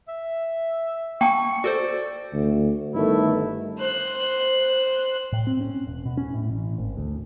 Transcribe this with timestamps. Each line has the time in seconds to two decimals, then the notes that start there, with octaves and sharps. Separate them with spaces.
0.08 E5
1.21 A#3 G5 A5 C#6
1.64 F#4 A4 C5 D5
2.33 D2
2.94 G1 D#3 A3 E4
3.78 C5 F#6
5.32 A2
5.47 C4
5.61 C#4
5.87 E1
6.05 B2
6.17 C#4
6.34 A2
6.51 A1
6.78 G#1
6.97 D2